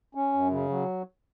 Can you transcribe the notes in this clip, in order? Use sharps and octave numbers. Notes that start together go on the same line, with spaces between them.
C#4
F#2
C#3
F#3